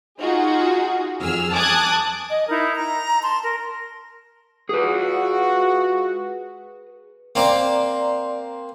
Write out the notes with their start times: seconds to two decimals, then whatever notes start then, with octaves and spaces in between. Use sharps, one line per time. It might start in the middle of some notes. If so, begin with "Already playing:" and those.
0.20 D#4 F4 F#4 G#4
1.21 F2 G#4 E6 F6
1.53 G#5 A5 D6 D#6 F#6 G#6
2.29 D#5
2.49 D#4 E4 A#4
2.76 A#5
3.22 A5 C6
3.42 A#4
4.69 G#3 F4 F#4 G#4 B4
7.35 A#3 C4 D5 A#5 C6 D6